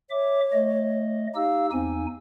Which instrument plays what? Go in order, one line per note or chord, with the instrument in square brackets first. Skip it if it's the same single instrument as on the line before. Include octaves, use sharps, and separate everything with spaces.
[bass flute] C#5 [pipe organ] E5 D6
[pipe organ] A3 D#5
[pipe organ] D#4 G4 E6 [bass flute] F5
[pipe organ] E2 D#4 G#5 [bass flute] C4